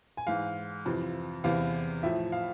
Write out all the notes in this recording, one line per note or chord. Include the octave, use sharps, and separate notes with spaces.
G#5
G#2 E3 F5
F2 C3 E3
E2 C3 E3 F5
A2 F3 E5
F5